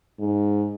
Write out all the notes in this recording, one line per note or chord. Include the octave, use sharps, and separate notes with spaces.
G#2